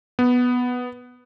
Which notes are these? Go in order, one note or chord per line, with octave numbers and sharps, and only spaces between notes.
B3